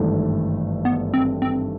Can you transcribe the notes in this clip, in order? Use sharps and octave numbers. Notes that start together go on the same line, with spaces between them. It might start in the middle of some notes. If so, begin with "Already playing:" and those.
Already playing: G#1 G2 E3 A3
B3
C4
C4